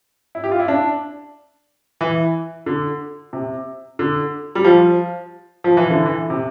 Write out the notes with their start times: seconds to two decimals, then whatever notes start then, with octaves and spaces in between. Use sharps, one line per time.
0.35 E4
0.44 G4
0.51 F4
0.59 E4
0.68 D4
2.01 E3
2.66 D3
3.33 C3
3.99 D3
4.55 G3
4.64 F3
5.64 F3
5.77 E3
5.90 D3
6.05 E3
6.30 C3